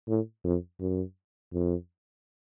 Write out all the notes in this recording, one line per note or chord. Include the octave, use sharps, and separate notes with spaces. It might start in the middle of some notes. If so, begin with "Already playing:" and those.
A2
F2
F#2
F2